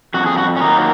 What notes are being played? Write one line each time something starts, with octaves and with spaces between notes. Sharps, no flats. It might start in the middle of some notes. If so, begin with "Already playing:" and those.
F2 F#4
G#4
F#4
C#4
D#3 F#3 A#3 D#4